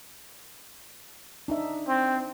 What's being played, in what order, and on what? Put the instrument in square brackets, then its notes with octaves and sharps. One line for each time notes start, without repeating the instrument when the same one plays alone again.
[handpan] D4 D#4 E5
[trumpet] C4